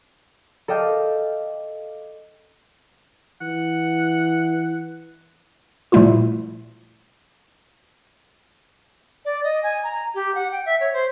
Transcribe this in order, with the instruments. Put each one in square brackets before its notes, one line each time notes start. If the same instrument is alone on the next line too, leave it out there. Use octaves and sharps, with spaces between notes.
[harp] A4 D5 D#5 F5 G5
[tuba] E3 [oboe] F#5
[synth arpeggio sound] A#2 F3 G3 A3 E4 F4
[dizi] D5
D#5
G#5
A#5
G4
F#5
G5
E5
C#5
C5